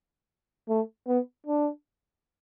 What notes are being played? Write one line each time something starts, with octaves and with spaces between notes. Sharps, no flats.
A3
B3
D4